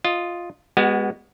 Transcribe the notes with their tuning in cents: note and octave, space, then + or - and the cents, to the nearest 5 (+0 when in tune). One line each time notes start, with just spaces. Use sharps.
F4 +0 D#5 +0
G#3 -25 B3 +0 F#4 +25